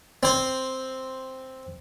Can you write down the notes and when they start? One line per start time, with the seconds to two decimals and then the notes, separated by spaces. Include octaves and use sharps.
0.23 C4 C5